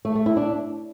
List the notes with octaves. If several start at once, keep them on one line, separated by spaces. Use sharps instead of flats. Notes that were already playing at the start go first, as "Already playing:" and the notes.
A3
A3
E4
D4